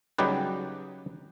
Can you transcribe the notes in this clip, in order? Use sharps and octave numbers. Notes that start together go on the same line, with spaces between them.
C#3 F#3 G3 D#4 G4 B4